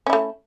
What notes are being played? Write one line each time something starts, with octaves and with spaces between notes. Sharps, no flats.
A3 C#4 E4